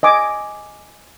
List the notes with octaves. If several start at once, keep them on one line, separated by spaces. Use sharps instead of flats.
D#5 G#5 D6